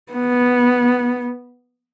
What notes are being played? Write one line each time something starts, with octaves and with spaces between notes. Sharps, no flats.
B3